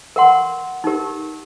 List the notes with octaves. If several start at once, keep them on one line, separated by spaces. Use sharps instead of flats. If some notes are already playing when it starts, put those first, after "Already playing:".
A#4 F#5 C6
D#4 G4 A#4